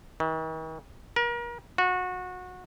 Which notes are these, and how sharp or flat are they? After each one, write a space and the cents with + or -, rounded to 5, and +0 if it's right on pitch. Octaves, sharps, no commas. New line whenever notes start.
D#3 +45
A#4 +35
F#4 -25